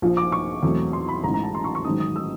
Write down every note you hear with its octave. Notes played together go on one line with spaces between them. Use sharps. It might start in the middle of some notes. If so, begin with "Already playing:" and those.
A#1 A#2 F3
D6
C#6
E2 B2 F#3 A3 C4
C6
B5
A1 G#2 E3 A#5
A#5
A5
C6
C#6
C#6
A1 G#2 D#3 F#3 D#6
D#6
E6